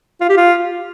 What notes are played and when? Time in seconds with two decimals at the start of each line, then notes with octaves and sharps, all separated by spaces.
0.21 F4
0.29 G4
0.37 F4